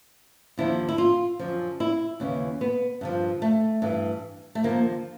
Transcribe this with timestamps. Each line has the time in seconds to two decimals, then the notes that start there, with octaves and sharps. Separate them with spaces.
0.58 D#2 D3 F3 E4
0.89 E4
0.98 F4
1.39 F#2 D3 F3
1.80 E4
2.20 D#2 C#3 E3
2.61 B3
3.01 G2 D3 F3
3.42 A3
3.82 G2 E3
4.55 A3
4.63 D#2 D3 F3 A#3